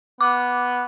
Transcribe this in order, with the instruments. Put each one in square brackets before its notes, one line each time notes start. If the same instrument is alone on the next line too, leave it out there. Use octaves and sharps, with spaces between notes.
[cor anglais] B3 [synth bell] D6